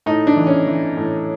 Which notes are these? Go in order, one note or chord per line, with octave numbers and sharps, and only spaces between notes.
A2 D#4
D4
E3
C#4
E3
A2